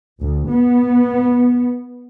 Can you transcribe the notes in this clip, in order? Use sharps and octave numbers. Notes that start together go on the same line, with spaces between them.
D2
B3